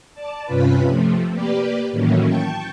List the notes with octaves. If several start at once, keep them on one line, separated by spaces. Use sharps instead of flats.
D5 A5
G2 C3 C#4 F4 B4 B5
C3 F3 A3
A#3 G4 B4 D5
A2 D#3 E3 F#3 A#3 C#4
G5 A5 C#6 G6